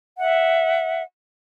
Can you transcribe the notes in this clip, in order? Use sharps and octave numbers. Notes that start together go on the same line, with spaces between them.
E5 F#5